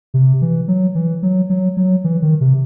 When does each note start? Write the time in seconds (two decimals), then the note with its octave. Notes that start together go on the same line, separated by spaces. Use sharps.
0.14 C3
0.42 E3
0.68 F#3
0.95 E3
1.23 F#3
1.50 F#3
1.77 F#3
2.04 E3
2.22 D#3
2.41 C3